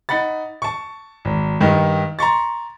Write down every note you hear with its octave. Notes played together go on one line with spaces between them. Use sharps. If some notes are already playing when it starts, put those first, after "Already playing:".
D#4 F#5 B5 A6
A5 C#6
G#1
G2 D#3 D#4
A#5 C6 C#6 A6